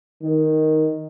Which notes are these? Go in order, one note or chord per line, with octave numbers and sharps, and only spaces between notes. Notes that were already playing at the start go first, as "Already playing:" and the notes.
D#3